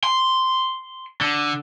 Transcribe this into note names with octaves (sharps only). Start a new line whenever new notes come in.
C6
D3